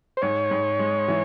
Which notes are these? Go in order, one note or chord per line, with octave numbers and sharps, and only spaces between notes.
C5
G#2 C#5
G#2
G#3
E3